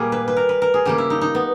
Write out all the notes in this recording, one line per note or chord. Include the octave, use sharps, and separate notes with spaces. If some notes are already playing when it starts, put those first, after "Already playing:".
Already playing: A#2 G3 A#3 G#4
B4
B4
A#4
B4
A#4
G#4
C#3 G3 A#3 G4
E4
D#4
D#4
B3